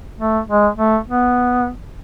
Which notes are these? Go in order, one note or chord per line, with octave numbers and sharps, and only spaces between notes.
A3
G#3
A3
B3